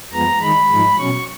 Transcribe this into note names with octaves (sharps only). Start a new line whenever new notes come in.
F2 F3 G#3 B3 A#5
D#3 G#3 D#4 B5
G#2 F3 G#3 D#4
B2 F#3 C#4 C#6